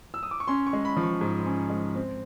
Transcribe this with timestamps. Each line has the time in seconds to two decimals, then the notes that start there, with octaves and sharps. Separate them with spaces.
0.14 E6
0.23 D#6
0.31 D6
0.40 C#6
0.48 C#4 C6
0.67 C#6
0.73 G#3
0.85 B5
0.97 F3
1.03 C#6
1.21 G#2
1.46 C#4
1.70 G#3
1.95 C4